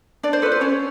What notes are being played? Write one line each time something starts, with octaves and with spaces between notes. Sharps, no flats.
D4 D5
C5
F4 A4 B4
C5
C#4 C#5